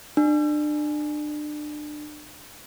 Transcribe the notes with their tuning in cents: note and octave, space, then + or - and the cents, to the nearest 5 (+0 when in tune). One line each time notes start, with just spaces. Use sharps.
D4 +30